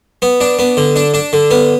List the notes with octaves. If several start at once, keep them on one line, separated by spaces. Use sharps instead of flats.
B3
D4
B3
D3
D4
D4
D3
B3